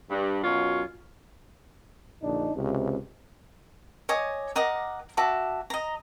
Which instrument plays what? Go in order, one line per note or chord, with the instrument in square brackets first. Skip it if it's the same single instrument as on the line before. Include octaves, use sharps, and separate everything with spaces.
[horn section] G2
F#2 B2 F4 C#5
[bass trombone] A#1 [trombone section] D3 D4 D#4
[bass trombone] C#2 [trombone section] C3
[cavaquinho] C#5 D#5 G#5 D6
A#4 D#5 F#5 D6
F#4 E5 A5 D6
D#5 A#5